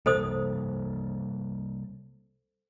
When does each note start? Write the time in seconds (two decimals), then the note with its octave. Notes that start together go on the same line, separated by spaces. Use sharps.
0.06 C3 G3 A#3 A4 C5 D#6